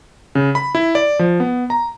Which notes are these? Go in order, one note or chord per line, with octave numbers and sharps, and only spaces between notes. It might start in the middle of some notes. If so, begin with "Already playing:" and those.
C#3
B5
E4
D5
F3
B3
A#5